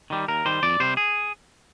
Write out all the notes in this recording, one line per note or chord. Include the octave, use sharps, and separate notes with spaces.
D#3 G3
D#2 A#4
D#3 G3 C5
F2 D5
C3 G3 C5
G#4